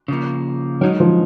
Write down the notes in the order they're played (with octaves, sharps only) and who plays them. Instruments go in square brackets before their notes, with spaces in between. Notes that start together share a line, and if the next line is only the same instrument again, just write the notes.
[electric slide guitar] C#3 F3 A#3
[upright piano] F#3 [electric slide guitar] G#3 D#4 A#4
[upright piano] F3